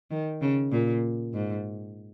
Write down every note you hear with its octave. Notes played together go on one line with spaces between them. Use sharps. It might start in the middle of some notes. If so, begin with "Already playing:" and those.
D#3
C#3
A#2
G#2